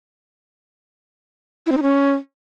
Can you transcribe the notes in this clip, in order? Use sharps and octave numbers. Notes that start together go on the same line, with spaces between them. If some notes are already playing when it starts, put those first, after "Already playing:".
E4
C4
D#4
C#4